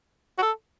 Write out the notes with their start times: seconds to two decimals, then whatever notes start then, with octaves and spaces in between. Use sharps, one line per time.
0.38 F#4
0.42 A4